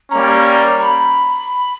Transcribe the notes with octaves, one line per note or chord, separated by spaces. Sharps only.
G3 A#3 C#4 A#5
B5